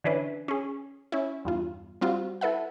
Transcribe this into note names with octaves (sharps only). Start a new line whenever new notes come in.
D3 E3 C#4 D4 E4 B4
C#4 G#4
C#4 E4
E2 G2 F4
G3 C4 F4 F#4
E4 A4 B4 E5 F#5